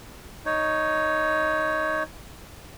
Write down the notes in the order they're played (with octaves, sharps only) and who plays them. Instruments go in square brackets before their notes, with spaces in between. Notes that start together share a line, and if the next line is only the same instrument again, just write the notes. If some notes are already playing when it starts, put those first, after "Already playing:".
[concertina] D#4 C#5